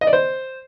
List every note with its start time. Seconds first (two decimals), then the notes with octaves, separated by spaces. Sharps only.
0.01 D#5
0.07 D5
0.13 C5